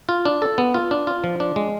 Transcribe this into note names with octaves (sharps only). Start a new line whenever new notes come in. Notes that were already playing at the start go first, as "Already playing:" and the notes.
F4
D4
A4
B3
F4
D4
F4
F3
D4
G#3